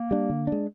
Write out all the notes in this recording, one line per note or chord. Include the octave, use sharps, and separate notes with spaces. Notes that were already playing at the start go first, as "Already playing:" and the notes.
Already playing: A#3
G3 D4
D3
G#3 D4